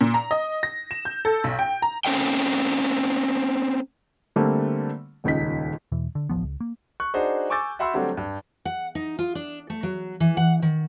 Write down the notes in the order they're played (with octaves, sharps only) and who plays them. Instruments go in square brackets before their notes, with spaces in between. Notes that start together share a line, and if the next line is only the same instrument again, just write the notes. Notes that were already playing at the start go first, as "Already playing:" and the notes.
[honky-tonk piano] A#2
A#5
D#5
A#6
E7
G6
A4
B1
G5
A#5
[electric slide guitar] A#3 C4 C#4 A4 D#5 G5
[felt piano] D3 G3 A3 A#3 C4
D#1 C#2 D#4 B6
[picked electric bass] E2 B2 E3
D3
D1 A1 F3 B3
C#2
A#3
[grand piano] C#6 F#6
D4 D#4 F#4 G#4 C5
G#5 C#6 D6 E6 G6 A6
F#4 E5 F#5 B5 C6 E6
D3 F#3 G3 A3 C4 D4
G2
[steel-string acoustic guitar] F#5
D#4
F4
D4
A3
F#3
E3
F#5
D#3